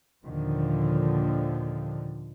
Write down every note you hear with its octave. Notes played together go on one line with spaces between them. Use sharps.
D#2 A#2 D3 D#3 F3